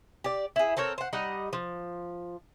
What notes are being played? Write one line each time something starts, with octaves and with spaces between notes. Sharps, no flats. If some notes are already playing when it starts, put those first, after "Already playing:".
G4 D5
E4 G#4
C4 A4 A#4 C#5
C5 F#5
G3 D#4 D#5 F#5
F3